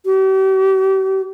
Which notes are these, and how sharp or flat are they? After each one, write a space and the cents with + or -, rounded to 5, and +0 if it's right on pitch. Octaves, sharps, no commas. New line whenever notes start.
G4 -40